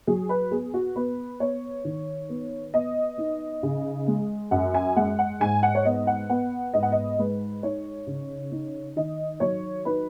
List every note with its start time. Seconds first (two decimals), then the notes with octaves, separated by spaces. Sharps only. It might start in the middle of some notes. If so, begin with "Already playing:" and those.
0.07 F#3 G#4
0.29 B4
0.51 B3 G#4
0.74 F#4
0.96 B3 B4
1.40 B3 C#5
1.85 D#3
2.29 B3
2.74 B3 D#5
3.18 D#4
3.63 C#3
4.08 G#3
4.51 F#2 F#5
4.74 G#5
4.96 G#3 F#5
5.19 F#5
5.40 G#2 G#5
5.63 F#5
5.75 C#5
5.85 B3 D#5
6.07 F#5
6.29 B3 F#5
6.74 G#2 D#5
6.83 F#5
6.92 D#5
7.19 G#3 B4
7.63 D#4 C#5
8.07 C#3
8.51 D#4
8.96 D#3 D#5
9.40 F#3 C#5
9.85 D#4 B4